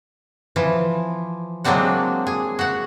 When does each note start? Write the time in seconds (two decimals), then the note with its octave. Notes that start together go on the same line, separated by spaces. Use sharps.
0.56 E3 F3
1.64 F#3 G#3 A#3 C4 D4 F#5
2.27 G#4
2.59 F#4 F#5